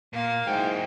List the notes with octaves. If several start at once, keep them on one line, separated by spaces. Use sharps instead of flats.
A#2 A#3 F5
G#2 F#3 E4 G5